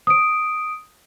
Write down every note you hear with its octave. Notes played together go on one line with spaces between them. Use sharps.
D#6 D7